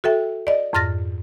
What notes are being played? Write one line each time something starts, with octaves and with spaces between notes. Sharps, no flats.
F#4 A4 E5 G5
D5 D#5
F2 G#2 F6 A6 A#6